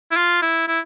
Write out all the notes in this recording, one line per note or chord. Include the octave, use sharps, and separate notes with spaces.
E4
F4
E4
E4